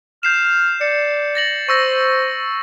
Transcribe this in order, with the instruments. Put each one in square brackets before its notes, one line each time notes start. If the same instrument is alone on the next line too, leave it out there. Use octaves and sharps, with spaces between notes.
[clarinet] F6 [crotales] G6 C7 E7
[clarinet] D5 [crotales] C#7
[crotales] A6 A#6 F#7
[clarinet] C5 [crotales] C#6 E6 A#6